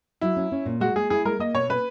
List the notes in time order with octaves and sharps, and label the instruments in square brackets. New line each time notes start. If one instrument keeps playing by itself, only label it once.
[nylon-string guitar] F#3 [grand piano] E4
[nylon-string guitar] C#4
C#4
A#2
[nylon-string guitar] G#3 [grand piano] F#4
[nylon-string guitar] G#3 [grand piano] G#4
[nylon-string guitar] E4 [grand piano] G#4
[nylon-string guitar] G#3 [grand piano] A#4
[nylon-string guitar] A#3 [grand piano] D#5
[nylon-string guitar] B2 [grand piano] C#5
[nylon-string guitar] C#4 [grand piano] B4